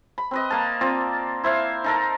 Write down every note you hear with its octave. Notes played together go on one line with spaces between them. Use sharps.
B5
C4 B4 D#5
A#3 F5 A5
C4 F4 D5
E4 C5 E5 F5
D#4 A4 A#4